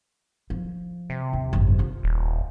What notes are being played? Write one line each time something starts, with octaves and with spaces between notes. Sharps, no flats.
F3
C3
D#2
G#1 F#2
F4
D#1